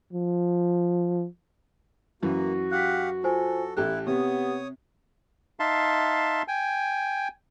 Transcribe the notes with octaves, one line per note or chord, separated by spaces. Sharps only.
F3
F#2 E3 A#3 F#4
G4 F5 F#5 F#6 B6
F4 A4 C5 G#5
A1 E4 G4 A4 F#6
C3 B3 G4 C#5 D#6
D#4 E5 F5 A5 C6
G5 G#5